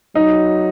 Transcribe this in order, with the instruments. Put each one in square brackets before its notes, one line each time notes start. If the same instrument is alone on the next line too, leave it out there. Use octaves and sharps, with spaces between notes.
[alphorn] F#3 [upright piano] D#4